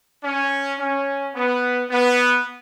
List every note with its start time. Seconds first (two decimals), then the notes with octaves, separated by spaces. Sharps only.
0.24 C#4
0.79 C#4
1.35 B3
1.90 B3